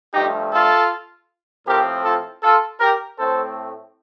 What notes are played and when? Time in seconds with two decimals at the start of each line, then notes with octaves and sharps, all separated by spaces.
0.14 G2 F3 A3 D#4 G4
0.52 F4 A4
1.66 A2 F3 C4 G4 A#4
2.04 F4 A4
2.43 F4 A4
2.80 G4 A#4
3.18 A2 A3 C4 A4 C5